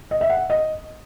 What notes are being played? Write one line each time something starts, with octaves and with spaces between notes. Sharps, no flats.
D#5
E5
F#5
D#5